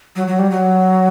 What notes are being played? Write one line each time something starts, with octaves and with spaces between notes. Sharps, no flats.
F#3
F#3
G3
F#3